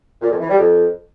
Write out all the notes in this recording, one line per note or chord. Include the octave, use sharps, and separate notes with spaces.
A#2
F2
E3
G3
F2